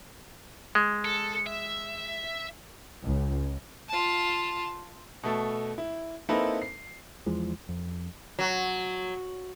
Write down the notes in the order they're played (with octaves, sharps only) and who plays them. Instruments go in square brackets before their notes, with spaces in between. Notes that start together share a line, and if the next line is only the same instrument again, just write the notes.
[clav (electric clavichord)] G#3
[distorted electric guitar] A4
E5
[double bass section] C#2
[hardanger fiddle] F4 A5
[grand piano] B2 A3 A4
E4
A#3 C4 D#4 E4 A4 B4
C7
[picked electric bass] E2 E3 F3 G#3
F2
[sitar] F#3